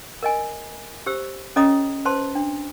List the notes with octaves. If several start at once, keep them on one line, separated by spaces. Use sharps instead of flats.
A#4 D#5 G#5
G4 C5 E6
C#4 A4 C#5 D#5 A#5 D#6
B4 C5 A5 C6
D4